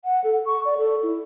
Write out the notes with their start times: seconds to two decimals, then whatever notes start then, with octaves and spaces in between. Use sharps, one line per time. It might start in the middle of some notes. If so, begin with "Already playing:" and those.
0.05 F#5
0.24 A4
0.46 C#6
0.65 D5
0.78 A4
1.03 E4